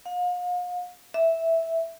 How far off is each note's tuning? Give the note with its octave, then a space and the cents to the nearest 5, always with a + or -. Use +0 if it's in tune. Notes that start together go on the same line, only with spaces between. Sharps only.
F5 +40
E5 -5